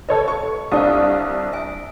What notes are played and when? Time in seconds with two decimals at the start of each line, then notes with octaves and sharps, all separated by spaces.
0.09 A4 B4 C#5 D#5
0.28 C#6
0.72 C2 D4 A4 D5 F5 D#6
1.53 E5 G#5